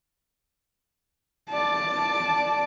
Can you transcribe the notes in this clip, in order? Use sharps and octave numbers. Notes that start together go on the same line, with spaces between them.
D5 A5